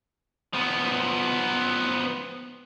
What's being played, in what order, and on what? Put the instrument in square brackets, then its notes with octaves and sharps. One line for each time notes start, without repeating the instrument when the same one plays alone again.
[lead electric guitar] F3 B3